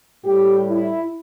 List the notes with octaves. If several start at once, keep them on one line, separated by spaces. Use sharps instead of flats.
A2 G3 G4
E4